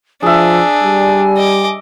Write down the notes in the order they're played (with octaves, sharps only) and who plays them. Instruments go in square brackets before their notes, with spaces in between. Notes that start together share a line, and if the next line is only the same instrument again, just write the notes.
[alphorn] F3 [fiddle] D4 [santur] G#4 E5 [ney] G#5
[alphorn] G3
[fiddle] D#5 D6